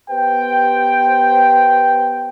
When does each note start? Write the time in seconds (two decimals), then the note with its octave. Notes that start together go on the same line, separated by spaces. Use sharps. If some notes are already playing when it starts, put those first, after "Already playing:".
0.10 B3 G4 B4 C5 G5